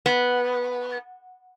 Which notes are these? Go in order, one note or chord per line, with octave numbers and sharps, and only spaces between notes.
B3